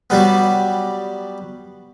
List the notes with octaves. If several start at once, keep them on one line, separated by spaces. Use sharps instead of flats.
F#3 G3 B3